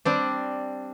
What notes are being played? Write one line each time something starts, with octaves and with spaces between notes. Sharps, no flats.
G3 C4 D4